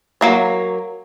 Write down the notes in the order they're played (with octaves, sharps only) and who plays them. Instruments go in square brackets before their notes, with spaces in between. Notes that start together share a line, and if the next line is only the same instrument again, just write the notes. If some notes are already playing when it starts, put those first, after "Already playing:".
[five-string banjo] F#3 A#3 C#5